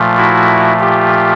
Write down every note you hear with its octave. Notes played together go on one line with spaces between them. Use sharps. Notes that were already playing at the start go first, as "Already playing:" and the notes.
Already playing: A#2 F3 A3
E4 F#4
F4 G4